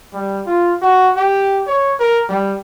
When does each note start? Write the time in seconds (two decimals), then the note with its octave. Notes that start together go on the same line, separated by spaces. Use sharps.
0.13 G3
0.47 F4
0.82 F#4
1.16 G4
1.67 C#5
2.00 A#4
2.29 G3